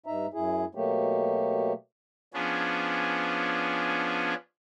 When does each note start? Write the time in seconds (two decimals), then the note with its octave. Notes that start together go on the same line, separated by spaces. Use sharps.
0.06 G2 D#4 E5 A#5
0.34 F#2 E4 G#4
0.75 B2 F#3 A3 A#3 G4
2.34 F3 B3 C#4 D4 G#4